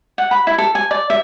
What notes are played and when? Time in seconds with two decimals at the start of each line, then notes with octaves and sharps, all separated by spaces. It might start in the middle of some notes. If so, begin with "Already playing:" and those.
0.18 F#5
0.31 B5
0.47 E4
0.58 A4
0.75 G#5
0.91 D5
1.10 E5